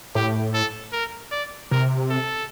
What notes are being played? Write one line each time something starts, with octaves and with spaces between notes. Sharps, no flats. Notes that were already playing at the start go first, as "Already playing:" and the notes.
A2 G4
A4
A#4
D5
C3 A#4
A4